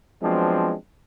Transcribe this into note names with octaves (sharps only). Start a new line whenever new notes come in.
F3 F#3 G#3 B3 C4 D4